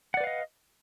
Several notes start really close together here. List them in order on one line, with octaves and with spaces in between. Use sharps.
F#5 D5 B4 F5 D#5